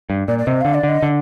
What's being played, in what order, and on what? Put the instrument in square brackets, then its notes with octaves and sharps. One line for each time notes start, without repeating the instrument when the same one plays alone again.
[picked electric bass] G2
[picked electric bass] A#2 [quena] D5
[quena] D5
[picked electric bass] C3 [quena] D#5
[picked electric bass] D3 [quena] F5
[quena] D5
[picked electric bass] D3
[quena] D#5
[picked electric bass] D3